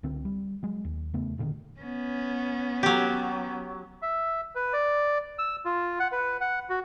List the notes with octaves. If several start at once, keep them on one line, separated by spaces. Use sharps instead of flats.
C#2 D3 C4
G3
F#3 G#3
D#2
E2 C#3 A3 B3
F#1 A#2 D3 D#3
B3 C#4
F#3 G4
E5
B4
D5
E6
F4
F#5
B4
F#5
F#4